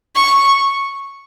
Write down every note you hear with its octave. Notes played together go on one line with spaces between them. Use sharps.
C#6